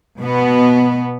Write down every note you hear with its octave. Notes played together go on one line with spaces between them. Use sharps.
B2 B3